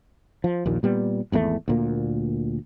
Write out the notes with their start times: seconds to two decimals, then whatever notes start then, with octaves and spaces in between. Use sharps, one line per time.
0.44 F3
0.66 A#1 D#2 A#2
0.83 A#2 G3 B3
1.32 G#1 E2 B2 A3
1.68 D2 A#2 A#3